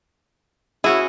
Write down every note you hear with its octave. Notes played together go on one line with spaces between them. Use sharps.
C#4 E4 F#4 G#4